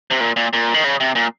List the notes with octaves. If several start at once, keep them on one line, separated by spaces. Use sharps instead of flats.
C3
A#2
A#2
A#2
D#3
C#3
C3
A#2